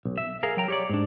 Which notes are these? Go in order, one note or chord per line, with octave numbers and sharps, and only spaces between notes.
B1
E5
G#4 A#4 F5
F#3 G5 A#5
G4 C#5 D5
G#2 D4